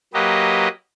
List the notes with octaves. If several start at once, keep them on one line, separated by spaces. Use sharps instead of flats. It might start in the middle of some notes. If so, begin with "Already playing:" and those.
F#3 A#3 G4 B4 D#5